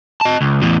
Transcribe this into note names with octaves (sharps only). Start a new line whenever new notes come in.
D#5 A5
C#2
E2 A2